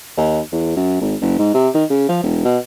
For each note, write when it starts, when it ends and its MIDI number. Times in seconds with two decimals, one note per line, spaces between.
0.17 0.40 39
0.52 0.74 40
0.76 0.99 42
1.01 1.15 32
1.21 1.34 30
1.39 1.51 44
1.54 1.69 48
1.74 1.84 51
1.90 2.08 49
2.09 2.19 53
2.23 2.44 28
2.45 2.58 47